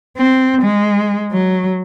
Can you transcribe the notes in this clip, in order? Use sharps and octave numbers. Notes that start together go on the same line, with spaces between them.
C4
G#3
F#3